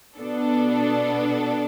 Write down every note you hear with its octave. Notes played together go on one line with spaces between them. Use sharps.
B2 B3 D4 A4